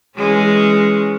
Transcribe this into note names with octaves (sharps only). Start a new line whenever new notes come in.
E3 G#3 C#4